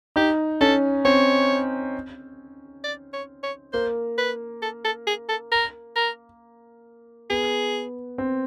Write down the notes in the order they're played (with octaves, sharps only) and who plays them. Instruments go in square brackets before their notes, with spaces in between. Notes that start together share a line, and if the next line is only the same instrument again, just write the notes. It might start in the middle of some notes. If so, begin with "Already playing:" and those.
[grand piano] D#4 [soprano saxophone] G4
[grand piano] C#4 [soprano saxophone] A4
[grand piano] C4 [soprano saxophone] C#5
[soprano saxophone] D5
C#5
C#5
[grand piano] A#3 [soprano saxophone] C5
[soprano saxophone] B4
A4
A4
G#4
A4
A#4
A#4
[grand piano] B3 [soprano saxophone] G#4
[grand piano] C4